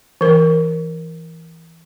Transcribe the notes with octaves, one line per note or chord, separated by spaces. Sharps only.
E3 A#4